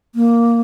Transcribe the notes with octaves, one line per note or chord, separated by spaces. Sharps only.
A#3